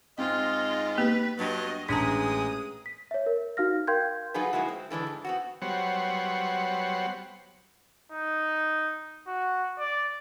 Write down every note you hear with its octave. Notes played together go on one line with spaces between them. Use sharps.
G#2 C4 F4 D#5
A#3 B3 G4 B4
G2 F#3 D#5
A1 G#3 D4 G#4 A5 A#5 D#6
B6
C#5 E5
A#4
D#4 F#4 F5 F6 A#6
A#4 F5 G5 C6 G6 G#6
F#3 D#4 F4 G#4 B4
F3 G#3 A#3 E4 F#4
C4
D3 E3 G#3 D4
G#2
B3 C4 F#4
F#3 G3 B3 C5 C#5 F#5
D#4
F#4
D5